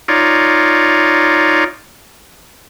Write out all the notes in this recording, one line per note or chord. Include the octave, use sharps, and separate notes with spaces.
D#4 F4 C#5 D5